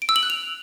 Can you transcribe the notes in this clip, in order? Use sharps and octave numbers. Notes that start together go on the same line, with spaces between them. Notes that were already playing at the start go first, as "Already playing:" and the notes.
D7
E6
F#7
F#6
F7